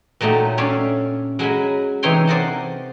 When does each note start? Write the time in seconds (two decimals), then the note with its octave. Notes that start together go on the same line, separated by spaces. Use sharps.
0.21 A#2 F#3 A3 D#4 G4
0.58 C#4 D4 C#5 D5 E5 F5
1.39 F#3 G#3 A#4 G#5 B5
2.03 C3 E3 D#4 C#5 G5 C6
2.27 A#4 C5 D5 D#5 F#5 A5